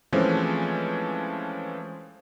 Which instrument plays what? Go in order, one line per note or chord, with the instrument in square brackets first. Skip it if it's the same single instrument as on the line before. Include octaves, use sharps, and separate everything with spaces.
[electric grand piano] E3 F3 G#3 A3 C4 C#4